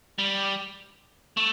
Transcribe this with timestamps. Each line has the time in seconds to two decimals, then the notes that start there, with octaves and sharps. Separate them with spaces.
0.19 G3
1.37 A3